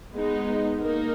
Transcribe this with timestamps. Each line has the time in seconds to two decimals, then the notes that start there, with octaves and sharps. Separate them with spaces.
0.12 G#3 B3 D#4
0.79 A#3 D#4 A#4